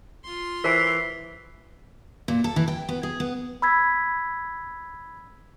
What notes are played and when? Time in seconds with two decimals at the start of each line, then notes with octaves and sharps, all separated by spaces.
0.24 F4 C6
0.64 E3 A#4 C5 G#5 B6 C7
2.28 A#2
2.44 A4
2.56 E3
2.68 G5
2.89 B3
3.03 G#4
3.20 B3
3.62 B5 E6 G#6 B6